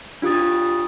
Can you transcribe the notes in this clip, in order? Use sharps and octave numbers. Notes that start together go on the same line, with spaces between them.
D4 F4 G4 D#6 A6